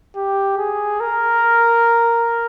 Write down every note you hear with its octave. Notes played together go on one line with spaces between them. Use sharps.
G4
G#4
A#4